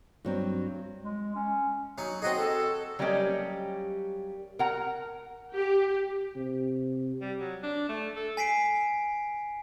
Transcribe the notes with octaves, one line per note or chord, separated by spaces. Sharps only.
G2 F#3 C4
G#3
C#4
F#3 C#4 D#4
C4 F#4 G#4 D#5
A4
F#3 G3 A#3 C#4 G4 D#5
A#4 F#5 A#5
G4
C3
G3
F#3
D4
A3
A4
G#5 B6 C7 D7